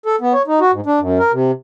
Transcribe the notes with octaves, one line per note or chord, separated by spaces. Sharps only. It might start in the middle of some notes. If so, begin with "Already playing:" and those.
A4
B3
C#5
D#4
F#4
G#2
D4
F#2
A#4
C3